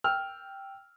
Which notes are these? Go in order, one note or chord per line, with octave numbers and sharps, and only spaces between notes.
G5 E6 F6